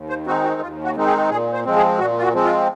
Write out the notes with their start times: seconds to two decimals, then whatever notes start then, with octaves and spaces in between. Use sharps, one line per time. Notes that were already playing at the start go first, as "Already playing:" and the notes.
Already playing: D#2
0.09 C5
0.27 D#3 G#3 C4 D#4 F#4
0.44 F#4
0.61 D#2 F4
0.84 F#4
0.96 D#3 G#3 C4 D#4
1.07 G#4
1.30 A#2 G#4
1.53 C5
1.65 F3 G#3 C4
1.76 G#4
1.99 A#2 F#4
2.18 F4
2.22 F#4
2.33 F3 G#3 C4
2.45 F4